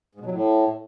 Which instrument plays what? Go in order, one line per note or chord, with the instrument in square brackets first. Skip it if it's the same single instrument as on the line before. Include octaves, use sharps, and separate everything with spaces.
[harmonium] G#2
B2
F#3
A2